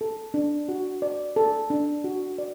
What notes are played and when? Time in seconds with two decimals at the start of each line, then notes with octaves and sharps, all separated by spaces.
0.01 A4
0.34 D4
0.69 F#4
1.02 D5
1.36 A4
1.70 D4
2.04 F#4
2.38 D5